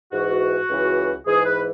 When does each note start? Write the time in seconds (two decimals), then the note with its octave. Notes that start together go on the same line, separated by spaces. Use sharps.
0.12 G#2 E3 F#4
0.68 C#2 C#3 E3
1.26 G#2 E3 G#4
1.45 B4